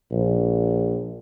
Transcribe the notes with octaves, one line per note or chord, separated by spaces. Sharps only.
A#1